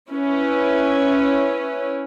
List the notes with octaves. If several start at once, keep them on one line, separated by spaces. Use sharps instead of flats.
C#4 E4 B4